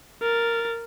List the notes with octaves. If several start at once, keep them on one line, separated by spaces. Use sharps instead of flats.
A#4 A6